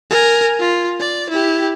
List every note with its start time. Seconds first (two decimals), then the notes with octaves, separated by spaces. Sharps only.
0.10 A#4 G#5
0.60 F4
1.00 D5
1.30 E4 G4